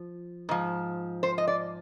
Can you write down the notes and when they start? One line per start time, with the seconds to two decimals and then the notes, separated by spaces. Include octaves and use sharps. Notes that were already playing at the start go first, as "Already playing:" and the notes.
Already playing: F3
0.49 G#2 F3
1.23 C5
1.38 D#5
1.48 D5